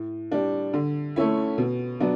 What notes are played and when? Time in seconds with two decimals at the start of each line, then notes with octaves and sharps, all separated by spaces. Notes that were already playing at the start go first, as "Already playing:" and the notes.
Already playing: A2
0.32 G3 D4
0.74 D3
1.16 A3 C#4 E4
1.58 B2
2.00 F#3 B3 D4